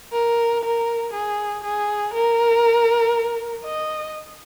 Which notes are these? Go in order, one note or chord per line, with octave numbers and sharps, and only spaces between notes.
A#4
A#4
G#4
G#4
A#4
D#5